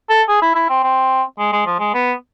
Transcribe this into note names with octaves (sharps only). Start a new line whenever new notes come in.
A4
G#4
E4
E4
C4
C4
G#3
G#3
F3
G#3
B3